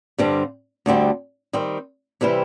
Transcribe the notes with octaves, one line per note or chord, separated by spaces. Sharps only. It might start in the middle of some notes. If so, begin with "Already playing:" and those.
G2 D3 G3 C4
D2 D3 G3 C4
D#3 G3 C4
C3 E3 G3 C4 E4